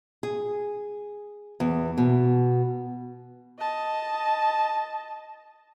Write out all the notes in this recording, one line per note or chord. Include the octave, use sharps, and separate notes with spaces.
G#4
E2
B2
D#5 A5